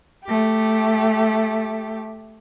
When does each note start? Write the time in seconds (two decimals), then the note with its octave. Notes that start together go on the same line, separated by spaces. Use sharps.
0.24 A3 G4